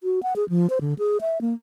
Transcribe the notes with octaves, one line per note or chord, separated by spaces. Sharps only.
F#4
F#5
G#4
F3
C5
D3
G#4
E5
A#3